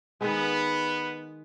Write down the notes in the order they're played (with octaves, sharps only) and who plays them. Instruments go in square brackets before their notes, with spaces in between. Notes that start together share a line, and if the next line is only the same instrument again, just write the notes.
[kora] D#3 G#3 [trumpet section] B3